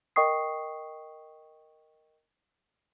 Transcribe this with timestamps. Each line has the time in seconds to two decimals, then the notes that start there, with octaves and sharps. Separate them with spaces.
0.16 A#4 D#5 G5 C#6 D#6 C7